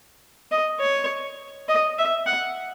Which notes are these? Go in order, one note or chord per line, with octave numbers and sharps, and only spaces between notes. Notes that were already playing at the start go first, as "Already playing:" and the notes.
D#5
C#5
D#5
E5
F#5